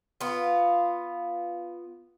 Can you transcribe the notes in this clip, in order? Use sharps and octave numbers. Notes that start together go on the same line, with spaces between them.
B3 F4